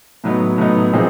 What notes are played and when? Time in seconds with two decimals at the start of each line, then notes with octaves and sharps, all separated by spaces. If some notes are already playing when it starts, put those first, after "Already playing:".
0.24 A2 F#3 B3 D#4
0.58 A2 F#3 B3 D#4
0.93 A#2 F3 G#3 C4 D#4